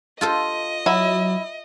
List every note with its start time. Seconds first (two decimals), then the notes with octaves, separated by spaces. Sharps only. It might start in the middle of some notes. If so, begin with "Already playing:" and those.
0.21 F4 A4 C5 D#5
0.86 F#3 E4